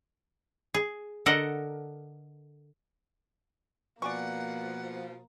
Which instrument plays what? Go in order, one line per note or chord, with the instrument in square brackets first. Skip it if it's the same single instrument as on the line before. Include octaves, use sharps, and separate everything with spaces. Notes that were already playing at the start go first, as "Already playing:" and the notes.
[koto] G#4
D3 A4 A#4 D#5 F#5
[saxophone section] B2 F3 [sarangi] A#3 [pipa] D5 G#5 C#6 [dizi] F#5